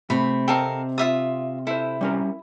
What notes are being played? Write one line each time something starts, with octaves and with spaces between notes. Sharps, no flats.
C3 A3 B5
C4 A4 A#4 D#5 F5 G5
F4 E5 D#6
E4 A4 C5
G3 C#4 A#4